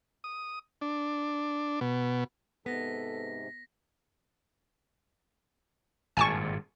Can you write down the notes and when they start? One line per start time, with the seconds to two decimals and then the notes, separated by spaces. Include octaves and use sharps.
0.24 D#6
0.81 D4
1.81 B2
2.66 G#2 C3 B3 A4 A#6 B6
6.17 G#1 G2 A#2 G#5 A5 C#6